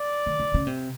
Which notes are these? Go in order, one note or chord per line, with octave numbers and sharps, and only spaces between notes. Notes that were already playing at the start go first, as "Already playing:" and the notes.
Already playing: D5
D#3
D3
C#3
C3